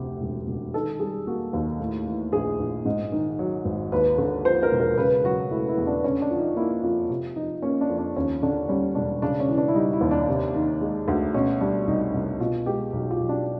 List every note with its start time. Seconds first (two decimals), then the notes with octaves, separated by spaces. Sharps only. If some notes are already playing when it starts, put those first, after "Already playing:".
Already playing: F1 D2 C3 G4
0.21 E1
0.47 E1
0.74 D#3 A4
1.00 G3 G#4
1.27 A#3 F#4
1.53 D#2
1.80 A2
2.06 E3
2.33 A#1 G#4
2.59 A#1
2.85 G#2
3.12 D#3
3.39 F#3
3.65 G#1
3.92 D#2 B4
4.18 D3
4.45 F3 C5
4.63 A#4
4.72 E1
4.80 A#4
4.97 C#3 B4
5.24 F#3 F#4
5.51 A3 E4
5.69 E4
5.78 E2
5.87 D4
6.04 D3 C#4
6.22 D4
6.31 F3
6.39 D#4
6.56 A#3 E4
6.83 F2 F4
7.10 C3 F4
7.36 F3 D#4
7.62 A#3 C#4
7.81 D4
7.89 F2
7.98 D4
8.16 D#2 C#4
8.42 D3 D4
8.69 G3 C#4
8.95 E1 D4
9.22 C#3 D4
9.40 C#4
9.49 E3
9.58 D4
9.68 E4
9.75 G3 D#4
9.93 E4
10.01 D#2
10.11 D4
10.29 C3
10.55 D#3
10.81 G#3
11.08 D2
11.34 B2 C#4
11.61 G3 D4
11.87 C2 D#4
12.14 C2
12.40 B2 F4
12.66 G#3 G4
12.93 B1
13.11 F4
13.20 B1
13.29 D4